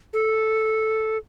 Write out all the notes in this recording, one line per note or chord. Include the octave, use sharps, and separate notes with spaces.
A4